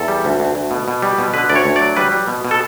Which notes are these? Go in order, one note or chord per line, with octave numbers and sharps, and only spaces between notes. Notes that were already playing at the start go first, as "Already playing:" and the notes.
Already playing: E2 A4
G3
D2
D2
D2
B2
B2
G3
B2
D3 B4
D2 D5
C#5
D2
D5
F#3
G3 B4
G3
B2
B2
A4